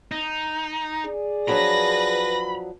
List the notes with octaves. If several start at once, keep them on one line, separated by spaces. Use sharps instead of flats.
D#4
G#4 D5
F3 F#3 D4 B4 B5 A#6